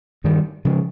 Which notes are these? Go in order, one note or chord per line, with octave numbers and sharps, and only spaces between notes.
G2 D#3 G3
C#3 F3 G#3